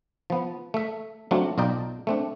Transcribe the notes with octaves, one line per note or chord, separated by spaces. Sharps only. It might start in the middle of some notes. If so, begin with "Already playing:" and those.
F3 B3
A3 E5
F#3 A3 C4 D4 F4 F#4
B1 F4 D5 D#5 G5 A#5
A3 C4 D4